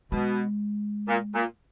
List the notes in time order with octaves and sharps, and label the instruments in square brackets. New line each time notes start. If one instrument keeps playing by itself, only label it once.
[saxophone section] B2 [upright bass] G#3
[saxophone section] A#2
A#2